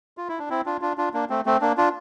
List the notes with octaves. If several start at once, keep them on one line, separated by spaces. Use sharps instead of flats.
F4
E4
D4
C4 E4
D4 F4
D4 F4
D4 F4
A#3 D4
A3 C4
A3 C4
A#3 D4
D4 F4